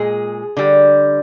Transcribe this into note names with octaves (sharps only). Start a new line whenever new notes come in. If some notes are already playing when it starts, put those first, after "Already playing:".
Already playing: A#2 G#3 G#4
D3 G3